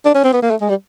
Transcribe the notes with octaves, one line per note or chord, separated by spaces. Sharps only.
D4
C#4
C4
B3
A#3
A3
G#3
G3